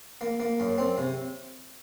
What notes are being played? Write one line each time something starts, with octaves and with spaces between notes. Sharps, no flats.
A#3
A#3
F#2
C4
C3